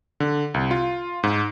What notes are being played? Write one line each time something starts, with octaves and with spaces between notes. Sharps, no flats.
D3
C2
F4
G#2